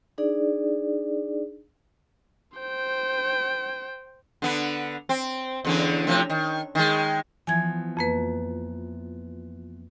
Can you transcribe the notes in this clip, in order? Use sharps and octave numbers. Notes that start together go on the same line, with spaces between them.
D4 D#4 G#4 D5
C5 G5
D3 B3
C4
E2 D3 C#4
A2 C3 F3
D#3
D#3 G#3
E3 F3 B3 G#5 G#6
F2 A#3 B4